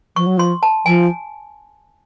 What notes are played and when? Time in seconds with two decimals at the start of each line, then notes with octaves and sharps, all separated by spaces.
0.16 F3 C#6
0.26 F#3
0.38 F3 C6
0.63 A5
0.86 F3 G#5